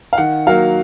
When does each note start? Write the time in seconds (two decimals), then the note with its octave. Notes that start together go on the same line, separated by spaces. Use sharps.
0.13 F5
0.18 D#3 F#5
0.47 F#3 A#3 F5